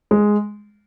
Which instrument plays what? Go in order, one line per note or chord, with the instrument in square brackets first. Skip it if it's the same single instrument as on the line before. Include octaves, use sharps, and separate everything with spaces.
[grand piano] G#3